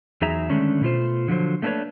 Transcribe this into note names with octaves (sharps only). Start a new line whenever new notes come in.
E2 F#3 D#4 G#4 E5 A#5
D3 D#3 G#3 A3 C#4 D4
B2 A3 F4 C5
D3 F3 F#3 C5
A3 A#3 D4 A#4 B4 C#5